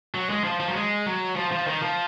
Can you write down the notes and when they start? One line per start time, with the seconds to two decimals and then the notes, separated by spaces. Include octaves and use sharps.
0.14 F#3
0.29 G#3
0.44 F3
0.60 F3
0.68 F#3
0.75 G#3
1.06 F#3
1.36 F3
1.52 F3
1.67 D#3
1.82 F3